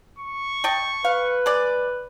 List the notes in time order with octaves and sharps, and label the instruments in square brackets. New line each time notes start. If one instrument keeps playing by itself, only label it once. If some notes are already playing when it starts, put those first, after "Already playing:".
[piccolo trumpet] C#6
[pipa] D#5 G5 A5
[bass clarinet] B4 [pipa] F5
[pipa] G#3 D5